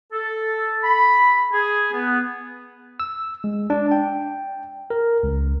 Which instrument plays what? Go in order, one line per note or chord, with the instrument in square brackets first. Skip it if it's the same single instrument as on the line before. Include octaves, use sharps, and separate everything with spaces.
[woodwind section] A4
B5
G#4
B3
[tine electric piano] E6
G#3
D4
G5
A#4
C#2